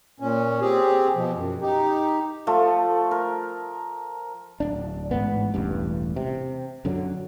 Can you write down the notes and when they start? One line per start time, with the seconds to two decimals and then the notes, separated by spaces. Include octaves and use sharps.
0.20 A#2 C#4
0.61 C4 G4 G#4
1.15 B2 F3
1.35 F#2
1.61 D#4 G4
2.47 F3 A3
3.11 A#4
4.60 D1 D4
5.11 A1 G#2 B3
5.54 E1 A1 G2
6.16 C3
6.85 F#2 D3 F#3